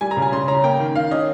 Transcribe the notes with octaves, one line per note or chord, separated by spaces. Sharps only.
G3 G#5
A#5
C#3
G#5
C#3 C6
C#4 A#5
A#3 G5
D#3
D#3 F5
C#4 D#5